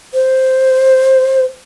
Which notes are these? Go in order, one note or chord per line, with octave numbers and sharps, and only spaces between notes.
C5